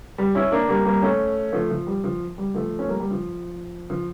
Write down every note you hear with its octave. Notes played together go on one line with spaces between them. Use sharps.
G3
C#4 E4
A#3 D4
G3 A#3
G3 A#3
A3 C#4
F3 A3
F3
G3
F3
G3
F3 A3
C#4
G3 A#3
G3
F3
F3